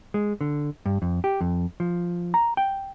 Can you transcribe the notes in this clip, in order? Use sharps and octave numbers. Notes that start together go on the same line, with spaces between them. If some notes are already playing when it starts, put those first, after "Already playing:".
G#3
D3
G2
F2
G4
F2
F3
A#5
G5